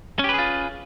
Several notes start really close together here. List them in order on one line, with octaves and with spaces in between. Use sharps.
C#4 G4 B4 G#4 F4